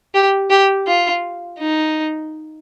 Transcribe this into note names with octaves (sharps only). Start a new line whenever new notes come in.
G4
G4
F4
D#4